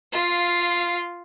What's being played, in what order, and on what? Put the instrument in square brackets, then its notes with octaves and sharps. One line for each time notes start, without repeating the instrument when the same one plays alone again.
[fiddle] F4 F5